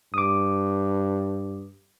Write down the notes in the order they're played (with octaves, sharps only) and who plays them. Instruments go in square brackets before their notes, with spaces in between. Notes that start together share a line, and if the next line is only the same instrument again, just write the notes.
[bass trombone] G2 [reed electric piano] D6 D#6